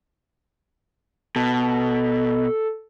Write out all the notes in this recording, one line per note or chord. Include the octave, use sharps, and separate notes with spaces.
B2 A4